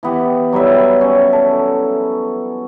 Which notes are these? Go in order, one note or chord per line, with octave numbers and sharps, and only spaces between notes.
E3 B3 G4
F#3 G3 E4 E5
C#4
A4